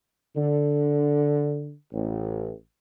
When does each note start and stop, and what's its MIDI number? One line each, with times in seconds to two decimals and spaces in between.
0.36 1.73 50
1.93 2.51 33